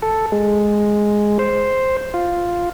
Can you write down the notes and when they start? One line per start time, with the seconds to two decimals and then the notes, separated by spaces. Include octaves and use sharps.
0.02 A4
0.32 G#3
1.39 C5
2.14 F4